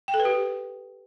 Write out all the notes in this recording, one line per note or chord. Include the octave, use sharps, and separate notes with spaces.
G5
A4
B4
G4